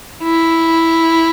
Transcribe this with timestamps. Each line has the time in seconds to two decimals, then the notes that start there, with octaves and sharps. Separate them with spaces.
0.23 E4